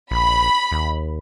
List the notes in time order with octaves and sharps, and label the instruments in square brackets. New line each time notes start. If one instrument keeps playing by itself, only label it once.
[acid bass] A#1 [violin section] B5
[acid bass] D#2